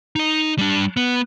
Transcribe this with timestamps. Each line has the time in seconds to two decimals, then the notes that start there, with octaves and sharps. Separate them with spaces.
0.16 D#4 D#5
0.58 G3 D4
0.97 B3